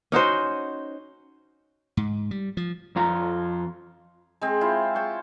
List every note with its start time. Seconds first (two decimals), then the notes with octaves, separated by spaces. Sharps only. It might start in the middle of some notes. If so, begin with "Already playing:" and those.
0.12 C#4 D#4 F#4 C5
1.97 G#2
2.31 G3
2.57 F3
2.96 F2 F4 A#5
4.41 G#3 C4
4.61 E4 F4 C5
4.95 C#5 G5 A5